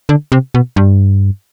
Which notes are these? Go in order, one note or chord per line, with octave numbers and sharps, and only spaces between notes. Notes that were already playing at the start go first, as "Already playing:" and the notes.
D3
C3
B2
G2